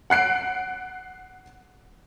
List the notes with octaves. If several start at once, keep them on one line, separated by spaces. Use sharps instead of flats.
F#5 F#6 C7 D7